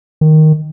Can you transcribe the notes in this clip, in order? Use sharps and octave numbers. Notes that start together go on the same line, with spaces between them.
D#3